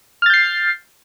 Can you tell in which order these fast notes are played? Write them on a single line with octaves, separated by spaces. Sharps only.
F6 A6 G6 C7